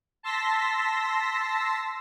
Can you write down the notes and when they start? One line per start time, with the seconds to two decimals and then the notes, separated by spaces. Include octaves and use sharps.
0.23 A5 C6 E6 A#6 B6